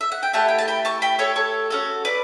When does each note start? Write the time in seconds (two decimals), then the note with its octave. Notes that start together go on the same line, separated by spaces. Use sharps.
0.01 E5
0.12 F#5
0.23 G5
0.33 A3 E4 G4 F#5 A5
0.49 G5
0.58 A5
0.68 G5 B5
0.85 A5 C#6
1.02 G5 B5
1.19 A4 C#5
1.36 A4 C#5
1.70 C#4 F#4 A4
2.05 B4 D5